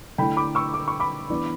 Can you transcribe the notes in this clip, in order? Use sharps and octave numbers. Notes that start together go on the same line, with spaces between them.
D3 A3 E4 G5 B5
B5 D6
C#6 E6
D6
C#6
B5 D6
E3 B3 D4